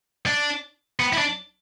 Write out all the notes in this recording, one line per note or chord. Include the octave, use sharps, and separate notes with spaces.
D4
B3
E4
D4